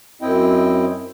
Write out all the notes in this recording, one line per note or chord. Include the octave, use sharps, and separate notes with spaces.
F#2 C4 E4 D#5 G5